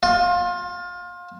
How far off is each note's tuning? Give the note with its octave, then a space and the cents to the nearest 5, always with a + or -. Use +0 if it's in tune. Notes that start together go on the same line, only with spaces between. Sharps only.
F4 +25